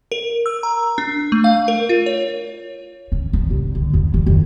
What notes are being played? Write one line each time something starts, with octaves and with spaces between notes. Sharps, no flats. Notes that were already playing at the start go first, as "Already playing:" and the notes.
A#4
E6
A#5
D4
A3
F5
A#4
F4
C#5
C#4
D4
C2
D3
E2
D#3
F2